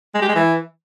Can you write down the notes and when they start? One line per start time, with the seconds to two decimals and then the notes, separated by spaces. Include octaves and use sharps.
0.15 G#3
0.21 G4
0.28 G#3
0.35 E3